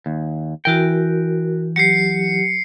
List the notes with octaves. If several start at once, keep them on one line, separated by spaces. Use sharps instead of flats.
D#2
E3 F#4 A#4 G5
F#3 G4 C7 C#7